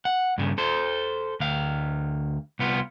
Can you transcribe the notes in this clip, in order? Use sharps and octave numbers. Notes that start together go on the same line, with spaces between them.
F#5
G2 C#3
A4 C5
D2 F5
C2 B3 F4